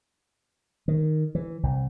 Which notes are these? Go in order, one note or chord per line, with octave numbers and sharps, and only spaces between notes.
D#3
E3
C2